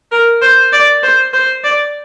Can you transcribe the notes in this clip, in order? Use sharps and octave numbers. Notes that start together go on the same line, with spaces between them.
A#4
C5
D5
C5
C5
D5